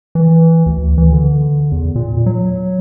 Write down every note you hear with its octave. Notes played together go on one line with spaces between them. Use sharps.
E3
D2
E3
D3
E2
A#2
F#3